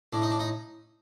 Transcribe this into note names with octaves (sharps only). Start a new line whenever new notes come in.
A2 D4
D#4
D4
D#4